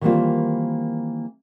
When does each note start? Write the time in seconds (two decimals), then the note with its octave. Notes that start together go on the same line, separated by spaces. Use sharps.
0.01 D#3 E3 G3 A#3 C4 F4